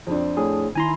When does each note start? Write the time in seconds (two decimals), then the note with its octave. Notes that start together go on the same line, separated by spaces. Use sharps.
0.07 F2 C4 D4
0.37 A2 G#4
0.75 D#3 E4 G#5 A#5 C6